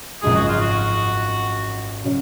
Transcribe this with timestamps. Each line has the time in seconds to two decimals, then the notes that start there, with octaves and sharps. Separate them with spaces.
0.22 G#1 F#2 C#3 F3 G#3 G#4
0.35 F#4
0.49 F4
0.61 F#4
2.04 C#3 F#3 C#4